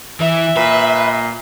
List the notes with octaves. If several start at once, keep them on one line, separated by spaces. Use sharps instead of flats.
E3 E5
A#2 B4